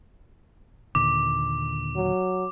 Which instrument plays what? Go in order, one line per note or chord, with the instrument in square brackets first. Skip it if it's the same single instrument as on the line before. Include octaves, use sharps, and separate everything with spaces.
[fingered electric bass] D#2 A#2 D3 [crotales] D6
[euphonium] F#3